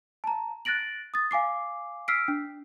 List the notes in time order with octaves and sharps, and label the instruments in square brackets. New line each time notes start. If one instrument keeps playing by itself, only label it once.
[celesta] A5 A#5
F#6 A6 A#6 D7 F#7
D#6 A6
F5 G#5 D6 C7
E6 F6 B6 C7 D7
D4